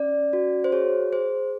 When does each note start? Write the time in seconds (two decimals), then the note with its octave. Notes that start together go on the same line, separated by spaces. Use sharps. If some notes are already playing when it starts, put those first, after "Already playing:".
Already playing: C#4 D5
0.33 F#4
0.64 C5
0.72 G#4 C#5
1.13 G#4 C5